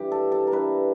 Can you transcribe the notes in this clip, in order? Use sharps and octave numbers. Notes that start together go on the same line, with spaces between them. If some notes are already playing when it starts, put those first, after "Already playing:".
Already playing: G2 E3 G4
A4
A4
A#4
G2 E3 B4